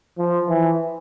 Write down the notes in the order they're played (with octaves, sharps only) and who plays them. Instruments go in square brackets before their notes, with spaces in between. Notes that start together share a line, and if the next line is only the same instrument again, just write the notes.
[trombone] F3
E3